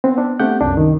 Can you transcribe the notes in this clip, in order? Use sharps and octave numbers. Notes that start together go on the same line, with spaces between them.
B3 C4
D4
A3 C4 D4 G4 F#5 G6
C2 F#2 D4
D#3